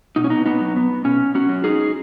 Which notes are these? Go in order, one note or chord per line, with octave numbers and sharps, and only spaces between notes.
B2 D#4
C#4
B3 D#4
B3 D#4
F#3
B3
B2 C#4
C#4 F#4
F#3
D#4 G#4